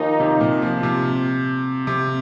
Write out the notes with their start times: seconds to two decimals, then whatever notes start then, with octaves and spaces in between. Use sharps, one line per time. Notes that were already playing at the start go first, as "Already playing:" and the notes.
Already playing: D#2 D#3 F3 A#3 D#4
0.20 C3
0.41 A#2
0.62 F3
0.83 C3
1.87 C3